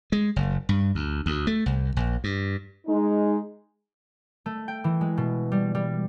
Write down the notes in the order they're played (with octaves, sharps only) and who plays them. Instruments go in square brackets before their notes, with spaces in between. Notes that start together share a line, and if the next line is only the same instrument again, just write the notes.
[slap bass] G#3
F#1
G2
D2
D2
A3
C2
A#1
G2
[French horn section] G#3 D#4
[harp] A3
G5
E3
G#3
B2
G3
G3